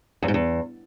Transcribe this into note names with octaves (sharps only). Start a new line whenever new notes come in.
E2
G#2
E2